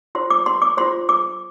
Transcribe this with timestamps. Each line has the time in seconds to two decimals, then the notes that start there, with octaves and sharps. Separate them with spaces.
0.15 F4 C5 C6
0.30 D6
0.46 C6
0.62 D6
0.77 F4 C5 C6
1.09 D6